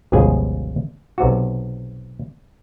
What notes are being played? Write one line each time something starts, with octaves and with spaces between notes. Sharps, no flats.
G1 C#2 B2 F3 G#4 G#5
B1 C3 F#4